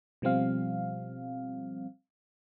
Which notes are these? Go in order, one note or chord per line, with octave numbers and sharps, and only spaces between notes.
B2 F3 G3 C4 F5